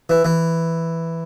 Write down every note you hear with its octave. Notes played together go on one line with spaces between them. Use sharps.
E3
E3